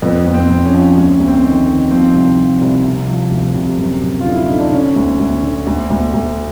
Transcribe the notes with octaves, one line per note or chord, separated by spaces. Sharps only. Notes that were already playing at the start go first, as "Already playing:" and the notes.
F2 B3
F2
C4
F2
C#4
F3
D2 C#4
D2
C4
D#3
D#3
F3 C4
C2
F3
C2
C3
F3
D2
C3
F#2
F#2
F4
D3
E4
D3 D#4
D4
D3 C#4
D2
D2
D3
D2
D2
D2